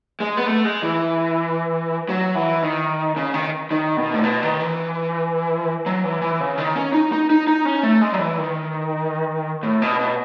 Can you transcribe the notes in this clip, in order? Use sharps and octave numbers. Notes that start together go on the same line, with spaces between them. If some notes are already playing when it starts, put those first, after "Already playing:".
G#3
B3
A3
G#3
E3
F#3
E3
D#3
C#3
D#3
D#3
B2
A2
B2
D#3
E3
F#3
E3
E3
C#3
D#3
C#4
D#4
D#4
D#4
D#4
C#4
A3
G#3
F#3
E3
D#3
A2
B2
B2